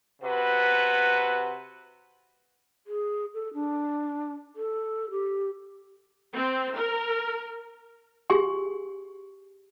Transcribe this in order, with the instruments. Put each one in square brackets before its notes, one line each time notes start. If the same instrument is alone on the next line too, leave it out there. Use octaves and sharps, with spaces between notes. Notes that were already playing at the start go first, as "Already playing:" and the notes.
[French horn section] C3 F#4 B4
[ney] G#4
A4
D4
A4
G4
[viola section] C4
A#4
[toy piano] G4 G#4 G#5 C6